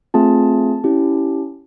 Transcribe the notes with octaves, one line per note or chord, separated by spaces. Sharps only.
A3 C4 F4 G#4 A5
C#4 E4 G4